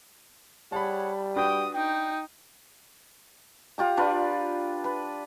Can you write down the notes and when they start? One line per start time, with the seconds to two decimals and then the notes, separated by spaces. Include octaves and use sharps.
0.72 G3 G#4 C#5 F#5 A5 B5
1.36 D4 F#4 B4 G5 D#6
1.75 D#4 G5
3.78 F4 G4 A#5
3.97 D4 F4 B4 D5
4.84 B4